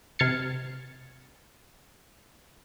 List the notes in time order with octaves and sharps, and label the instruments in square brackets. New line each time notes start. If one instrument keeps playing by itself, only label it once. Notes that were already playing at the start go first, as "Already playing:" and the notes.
[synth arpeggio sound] C3 F6 G#6 A6 C7 C#7